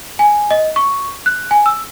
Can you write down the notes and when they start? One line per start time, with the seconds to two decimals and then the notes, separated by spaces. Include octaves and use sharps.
0.19 G#5
0.51 D#5
0.76 C#6
1.26 F#6
1.51 G#5
1.66 E6